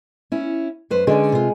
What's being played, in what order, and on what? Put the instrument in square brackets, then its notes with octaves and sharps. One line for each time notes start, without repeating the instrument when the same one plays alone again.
[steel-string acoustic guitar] C#4 E4
F#2 B4 C5
[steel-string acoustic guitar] D3 C#4 D5 [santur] G#3
[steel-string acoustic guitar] C3 F4